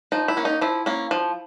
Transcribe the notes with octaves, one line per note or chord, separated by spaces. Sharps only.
F3 D#4
E4
A#3 C#4
D#4
F3 E4
A#3 C#4
F3